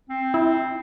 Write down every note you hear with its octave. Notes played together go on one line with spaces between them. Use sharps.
C4
E4